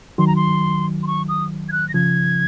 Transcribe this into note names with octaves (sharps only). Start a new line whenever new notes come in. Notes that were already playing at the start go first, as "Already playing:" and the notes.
D#3 F#3 C6
A#5
C6
C6
C#6
D#6
G#6
F#6
A#6
C#3 F3 G#6